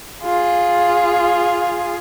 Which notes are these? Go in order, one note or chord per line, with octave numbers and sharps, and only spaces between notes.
F4 G#4